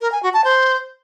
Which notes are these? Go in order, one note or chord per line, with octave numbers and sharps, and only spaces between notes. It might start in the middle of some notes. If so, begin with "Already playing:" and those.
A#4
G#5
F#4
A5
C5